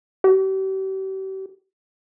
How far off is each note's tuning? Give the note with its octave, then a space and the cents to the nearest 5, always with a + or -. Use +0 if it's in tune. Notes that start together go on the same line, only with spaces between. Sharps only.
G4 -40